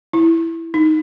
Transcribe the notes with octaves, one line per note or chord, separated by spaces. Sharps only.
E4
D#4